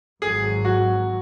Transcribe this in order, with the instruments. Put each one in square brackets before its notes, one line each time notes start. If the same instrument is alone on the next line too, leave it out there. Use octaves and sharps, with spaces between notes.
[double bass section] G#1 G#2 F#3 [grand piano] G#4
[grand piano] F#4